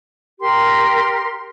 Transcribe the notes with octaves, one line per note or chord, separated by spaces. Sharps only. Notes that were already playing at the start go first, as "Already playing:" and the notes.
G4 A#4 C6